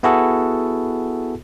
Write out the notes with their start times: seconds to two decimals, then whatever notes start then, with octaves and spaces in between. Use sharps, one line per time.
0.03 B3 E4 F#4 G#4 A4